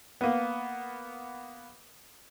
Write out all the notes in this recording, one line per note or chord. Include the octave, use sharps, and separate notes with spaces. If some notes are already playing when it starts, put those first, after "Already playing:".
A#3 B3